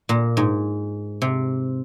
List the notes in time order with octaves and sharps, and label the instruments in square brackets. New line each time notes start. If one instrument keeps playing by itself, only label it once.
[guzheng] A#2
G#2
C3